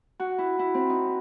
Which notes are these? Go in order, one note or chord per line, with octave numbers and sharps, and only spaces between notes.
F#4
E4
E4
C4
D#4